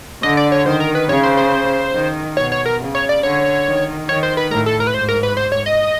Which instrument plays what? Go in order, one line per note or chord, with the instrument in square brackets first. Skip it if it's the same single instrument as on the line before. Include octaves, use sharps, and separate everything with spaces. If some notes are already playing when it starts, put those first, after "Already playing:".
[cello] D3 [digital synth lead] D#5
[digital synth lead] D5
C#5
[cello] D#3 [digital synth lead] C5
[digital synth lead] A#4
B4
[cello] C#3 [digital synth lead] C#5
[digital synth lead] C5
C5
[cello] D#3
[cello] B2 [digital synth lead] C#5
[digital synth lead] C#5
A#4
[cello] C#3
[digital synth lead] C#5
D5
[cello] D3 [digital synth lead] C#5
[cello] D#3
[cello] D#3 [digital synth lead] C#5
[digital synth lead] C5
B4
[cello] A2 [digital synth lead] A#4
[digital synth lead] A4
A#4
B4
[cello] G#2 [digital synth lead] C5
[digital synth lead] A#4
B4
C5
C#5
D#5